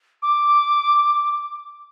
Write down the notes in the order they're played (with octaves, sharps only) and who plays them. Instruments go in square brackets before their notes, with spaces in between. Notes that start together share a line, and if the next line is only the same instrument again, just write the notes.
[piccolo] D6